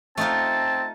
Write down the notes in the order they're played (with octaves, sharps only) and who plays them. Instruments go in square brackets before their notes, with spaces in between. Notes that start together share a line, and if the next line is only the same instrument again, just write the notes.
[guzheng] A3 D#4 F4 [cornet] C4 [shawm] A5